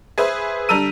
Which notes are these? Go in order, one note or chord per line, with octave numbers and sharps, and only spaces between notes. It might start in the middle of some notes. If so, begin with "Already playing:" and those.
G#4 B4 C5 E5
D3 G3 A4 A#5 E6 D#7